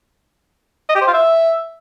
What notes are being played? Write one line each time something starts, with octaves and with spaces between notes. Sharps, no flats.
D#5
G4
C5
F4
E5